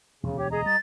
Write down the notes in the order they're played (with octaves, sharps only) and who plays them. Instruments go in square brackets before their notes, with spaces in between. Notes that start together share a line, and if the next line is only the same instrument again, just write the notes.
[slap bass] E1 D2 [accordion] C#3
[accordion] G4 [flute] C#5
[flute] G#4 [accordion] D#5 A#5
[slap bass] G3 [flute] A6